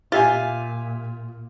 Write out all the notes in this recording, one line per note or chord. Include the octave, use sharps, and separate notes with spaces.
A#2 F4 G4 E5 G#5